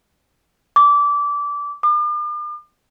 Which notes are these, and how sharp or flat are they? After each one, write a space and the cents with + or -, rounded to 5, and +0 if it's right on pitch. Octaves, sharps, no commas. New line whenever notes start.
D6 -20
D6 +45